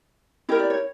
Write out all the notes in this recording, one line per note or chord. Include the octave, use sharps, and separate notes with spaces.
E4 G4 A#4 D#5
D5
C#5